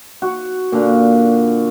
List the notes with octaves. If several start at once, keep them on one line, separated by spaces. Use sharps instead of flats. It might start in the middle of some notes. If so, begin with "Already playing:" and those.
F#4
A#2 D3